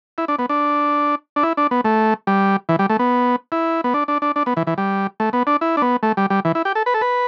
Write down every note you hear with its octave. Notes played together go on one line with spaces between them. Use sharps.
E4
D4
B3
D4
D4
E4
D4
B3
A3
G3
E3
G3
A3
B3
E4
B3
D4
D4
D4
D4
B3
E3
E3
G3
A3
B3
D4
E4
D4
B3
A3
G3
G3
E3
E4
G4
A4
B4
A4
B4